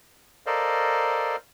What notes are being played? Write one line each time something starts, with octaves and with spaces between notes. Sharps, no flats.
A4 A#4 C5 D5 D#5 F5